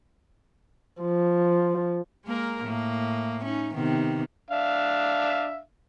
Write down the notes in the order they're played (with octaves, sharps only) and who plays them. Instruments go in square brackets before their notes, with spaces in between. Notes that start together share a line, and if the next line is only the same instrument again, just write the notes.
[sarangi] F3
[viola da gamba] G#3 A#3 A#4
A2 A#3
C#4 D#4
C3 D#3 B3
[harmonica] D4 E5 F5